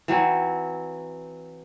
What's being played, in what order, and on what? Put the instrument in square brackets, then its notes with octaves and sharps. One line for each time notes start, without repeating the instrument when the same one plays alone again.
[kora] E3 F#3 C4